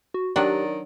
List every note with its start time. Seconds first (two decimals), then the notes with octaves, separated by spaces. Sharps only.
0.14 F#4
0.36 D#3 F#3 D4 G4 D5 F#5